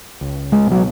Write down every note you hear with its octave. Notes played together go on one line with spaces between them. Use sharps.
C#2
G#3
B2 F#3